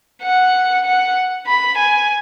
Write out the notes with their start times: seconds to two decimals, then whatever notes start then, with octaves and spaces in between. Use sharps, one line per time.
0.22 F#5
0.85 F#5
1.47 B5
1.78 G#5